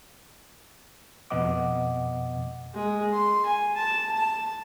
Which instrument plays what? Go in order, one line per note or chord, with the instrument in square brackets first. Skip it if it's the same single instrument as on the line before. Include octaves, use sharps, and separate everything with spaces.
[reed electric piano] F2 B2 B3 D#5 F#5 D6
[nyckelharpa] G#3
C6
G#5
A5
A5